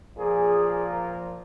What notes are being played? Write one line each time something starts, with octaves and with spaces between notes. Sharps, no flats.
A#2 F3 A#3 G#4
A#4